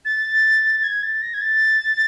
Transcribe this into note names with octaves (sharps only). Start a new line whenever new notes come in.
A6
G#6
A6
A#6
G#6
A6